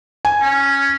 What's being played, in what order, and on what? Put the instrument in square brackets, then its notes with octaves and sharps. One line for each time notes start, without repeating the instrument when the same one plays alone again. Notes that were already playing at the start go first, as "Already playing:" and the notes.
[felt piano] G#5
[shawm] C#4